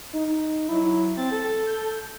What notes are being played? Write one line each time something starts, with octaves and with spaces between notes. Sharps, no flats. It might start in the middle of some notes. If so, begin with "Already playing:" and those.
D#4
F#3 E4
C4 A6
A4
G6